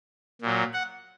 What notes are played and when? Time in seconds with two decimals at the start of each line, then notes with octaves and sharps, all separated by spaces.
0.41 A#2 F#3
0.73 F#5